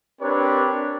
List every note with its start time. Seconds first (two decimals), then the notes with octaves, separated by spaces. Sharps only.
0.21 C4 D4 G4 A#4 B4 C#5